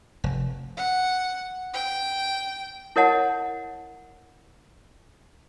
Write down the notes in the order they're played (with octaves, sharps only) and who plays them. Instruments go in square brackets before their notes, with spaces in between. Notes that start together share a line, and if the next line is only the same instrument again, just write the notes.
[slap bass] F1
[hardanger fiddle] F#5
G5
[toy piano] E4 A#4 C#5 D#5 F#5 A5